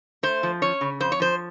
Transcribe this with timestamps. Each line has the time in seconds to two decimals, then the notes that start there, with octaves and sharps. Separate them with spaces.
0.23 A3 C5
0.43 F3
0.62 C#4 C#5
0.81 C#3
1.00 F2 C5
1.12 C#5
1.20 F3 C5